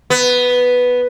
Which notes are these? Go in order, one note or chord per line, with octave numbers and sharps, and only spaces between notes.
B3